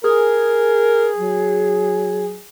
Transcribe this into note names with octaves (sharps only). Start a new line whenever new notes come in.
G#4 A#4
F#3